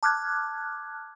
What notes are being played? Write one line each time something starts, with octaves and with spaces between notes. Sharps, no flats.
A5 D6 F6 F#6 G#6